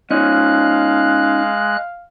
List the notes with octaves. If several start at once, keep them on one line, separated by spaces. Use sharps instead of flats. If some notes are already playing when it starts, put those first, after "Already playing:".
G#3 C#4 D#4 F5 F#6